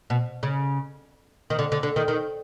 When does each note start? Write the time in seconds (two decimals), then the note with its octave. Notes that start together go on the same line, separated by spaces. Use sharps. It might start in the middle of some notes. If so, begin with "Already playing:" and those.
0.10 B2
0.43 C#3
1.50 D#3
1.59 D3
1.72 D3
1.83 D3
1.96 D#3
2.08 D#3